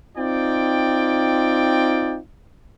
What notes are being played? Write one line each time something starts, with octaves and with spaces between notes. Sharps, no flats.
C4 D#4 F4 D5 G5